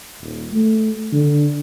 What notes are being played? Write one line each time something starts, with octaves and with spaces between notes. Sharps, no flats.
D#1
A3
D3